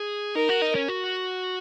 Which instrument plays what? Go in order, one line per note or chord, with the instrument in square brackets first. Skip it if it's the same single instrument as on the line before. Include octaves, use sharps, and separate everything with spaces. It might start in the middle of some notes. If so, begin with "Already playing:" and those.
Already playing: [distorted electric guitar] G#4
[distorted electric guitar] D#4 [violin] A#4
[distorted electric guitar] F#4
D#4
C#4
F#4